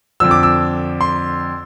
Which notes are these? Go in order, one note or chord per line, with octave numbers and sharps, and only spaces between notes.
F2 D3 F3 E6
D6
E6
C6